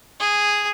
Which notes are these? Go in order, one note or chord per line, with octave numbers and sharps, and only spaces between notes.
G#4